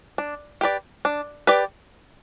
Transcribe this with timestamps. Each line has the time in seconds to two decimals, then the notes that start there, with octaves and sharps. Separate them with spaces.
0.18 D4
0.61 G4 B4 D5
1.05 D4
1.47 G4 B4 D5